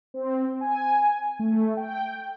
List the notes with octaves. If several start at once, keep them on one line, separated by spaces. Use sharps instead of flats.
C4
G#5
A3
G5